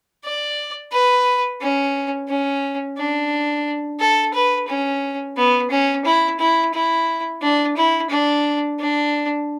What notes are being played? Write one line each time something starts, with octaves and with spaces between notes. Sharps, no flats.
D5
B4
C#4
C#4
D4
A4
B4
C#4
B3
C#4
E4
E4
E4
D4
E4
D4
D4